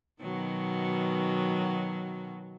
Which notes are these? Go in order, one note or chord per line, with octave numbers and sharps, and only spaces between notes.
B2 D#3 F#3